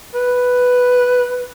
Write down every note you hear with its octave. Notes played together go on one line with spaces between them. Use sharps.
B4